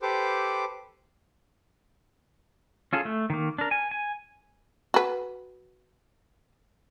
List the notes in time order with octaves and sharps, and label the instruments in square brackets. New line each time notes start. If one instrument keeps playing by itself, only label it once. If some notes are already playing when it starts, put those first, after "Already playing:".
[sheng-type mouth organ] G4 A4 B4 C5 D6
[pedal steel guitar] C#4 F4 G#4 A4
A3
D#3 A#3
D4 A#4
G#5
G#5
[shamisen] F#4 B4